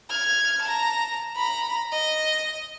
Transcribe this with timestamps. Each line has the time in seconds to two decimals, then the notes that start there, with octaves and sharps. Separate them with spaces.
0.10 F6 G#6
0.63 A5 A#5
1.36 A#5 B5
1.92 D#5